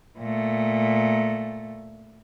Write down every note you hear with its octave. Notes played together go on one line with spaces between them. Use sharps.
A#2 A3